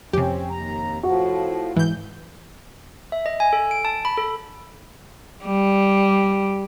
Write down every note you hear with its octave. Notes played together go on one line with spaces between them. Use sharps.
F2 C3 C4 C#4 G4
D#2 A#5
A2 F3 F#4
G#2 E3 G6
E5
D#5
G#5
A4
D7
A5
B5
A4
G3